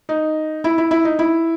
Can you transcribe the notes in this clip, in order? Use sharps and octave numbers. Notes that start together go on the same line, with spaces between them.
D#4
E4
E4
E4
D#4
E4